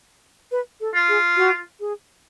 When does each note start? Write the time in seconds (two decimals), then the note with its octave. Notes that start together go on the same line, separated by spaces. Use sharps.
0.51 B4
0.80 A4
0.95 F4
1.09 G#4
1.37 F#4
1.80 G#4